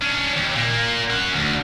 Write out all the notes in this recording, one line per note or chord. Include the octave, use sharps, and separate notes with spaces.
C#4 D4
D#2
A#2 A#3
C#4 F#5
D2